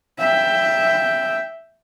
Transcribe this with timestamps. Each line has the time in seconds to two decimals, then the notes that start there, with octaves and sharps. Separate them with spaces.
0.19 E5 G5